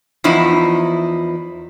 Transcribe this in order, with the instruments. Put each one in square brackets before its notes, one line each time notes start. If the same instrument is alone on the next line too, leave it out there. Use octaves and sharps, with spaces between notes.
[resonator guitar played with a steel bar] E2 F3 D#4 E4